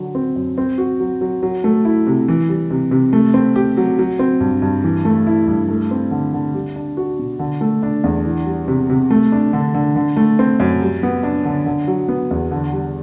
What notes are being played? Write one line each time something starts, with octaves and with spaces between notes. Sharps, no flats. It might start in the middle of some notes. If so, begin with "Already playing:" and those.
Already playing: D3 F#3
C4
F#2
C4
F#4
F#3
F#3
F#3
A3
E4
C3
E3
G3
C3
C3
A3
C4
G4
F#3
F#3
C4
G2
G2
E3
A3
E4
G2
A3
C4
D3
D3
G3
D4
F#4
B2
D3
A3
D4
E2
E3
G3
C3
C3
A3
D4
D3
D3
D3
A3
C4
F#2
G3
B3
D4
D3
D3
F#3
B3
E2
D3
G3